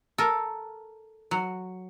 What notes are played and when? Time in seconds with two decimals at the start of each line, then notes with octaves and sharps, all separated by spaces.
0.18 A4 A#4
1.31 F#3